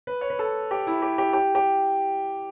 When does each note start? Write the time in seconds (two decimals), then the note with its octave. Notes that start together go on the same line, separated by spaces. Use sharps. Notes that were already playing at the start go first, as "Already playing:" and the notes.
0.07 B4
0.21 C#5
0.30 B4
0.39 A4
0.71 G4
0.87 E4
1.02 G4
1.18 G4
1.33 G4
1.55 G4